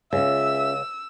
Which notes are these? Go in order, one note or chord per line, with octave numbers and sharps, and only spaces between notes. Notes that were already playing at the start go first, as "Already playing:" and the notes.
C#2 C#4 F4 G#4 E5 E6